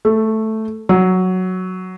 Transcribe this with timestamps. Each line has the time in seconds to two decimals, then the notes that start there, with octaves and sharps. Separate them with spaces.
0.05 A3
0.89 F#3